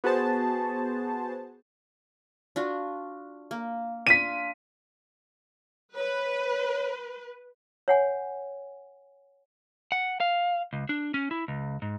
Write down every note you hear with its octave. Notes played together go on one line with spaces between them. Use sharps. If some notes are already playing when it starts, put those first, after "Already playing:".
B3 F#4 G#4 C5 A5
D4 F4 F#4
A#3
D4 F4 B6 D#7
B4 C#5
C#5 F#5 G#5
F#5
F5
C#2
D4
C#4
E4
C#2
G#2